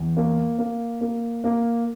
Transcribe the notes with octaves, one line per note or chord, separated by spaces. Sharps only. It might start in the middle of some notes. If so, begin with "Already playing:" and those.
Already playing: E2
A#3
A#3
A#3
A#3